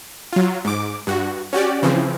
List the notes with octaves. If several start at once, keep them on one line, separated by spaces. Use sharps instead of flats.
F#3 F4
G#2 D6
G2 F#4
C#4 F#4 G4 D5
C#3 E3 F3 C4